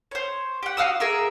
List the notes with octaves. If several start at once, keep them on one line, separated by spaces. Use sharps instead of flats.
C5 C#5
G4 F#5
F#4 F5 D#6 E6
G#4 A#4 E5